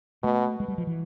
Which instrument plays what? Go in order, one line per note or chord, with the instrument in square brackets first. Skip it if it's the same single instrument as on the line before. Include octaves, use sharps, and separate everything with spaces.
[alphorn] B2 [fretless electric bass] A3
[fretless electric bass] G#3
G3
F3
E3